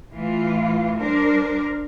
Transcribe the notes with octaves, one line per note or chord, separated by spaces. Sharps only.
A2 E3 F4
G3 D4 A#4 C5